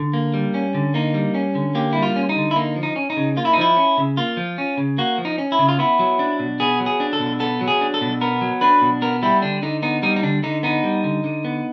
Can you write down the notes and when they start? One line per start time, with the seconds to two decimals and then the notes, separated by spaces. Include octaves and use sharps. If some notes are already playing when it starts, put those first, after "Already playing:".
Already playing: D3
0.13 A#3
0.34 G3
0.54 C#4
0.75 D3
0.94 A#3 D#4
1.14 G3
1.35 C#4
1.55 D3
1.75 A#3 G4
1.93 G3 E4
2.03 F4
2.16 C#4
2.29 D#4
2.36 D3
2.51 E4
2.56 A#3 D#4
2.76 F3
2.83 D#4
2.96 C#4
3.10 D#4
3.17 C#3
3.37 A#3 F4
3.45 E4
3.53 D#4
3.57 F3 E4
3.77 C#4
3.98 C#3
4.17 A#3 F4
4.37 F3
4.58 C#4
4.78 C#3
4.98 A#3 F#4
5.18 F3
5.25 D#4
5.38 C#4
5.52 E4
5.59 C#3
5.68 F4
5.79 B3 E4
5.99 F#3
6.19 D4
6.40 B2
6.60 B3 G#4
6.80 F#3
6.86 G#4
7.00 D4
7.13 A4
7.20 B2
7.40 B3 A4
7.61 F#3
7.68 G#4
7.81 D4
7.94 A4
8.01 B2
8.21 B3 A#4
8.41 F#3
8.61 D4 B4
8.82 B2
9.02 B3 A#4
9.23 G3 E4
9.42 D3 D4
9.63 D3 D#4
9.82 B3 D#4
10.03 G3 D#4
10.16 D#4
10.23 D3 D4
10.43 D3 D#4
10.63 B3 D#4
10.83 G3
11.04 D3
11.24 D3
11.45 B3